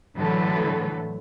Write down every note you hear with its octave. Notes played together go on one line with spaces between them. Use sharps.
A2 D3 E3 F#3 A4 B4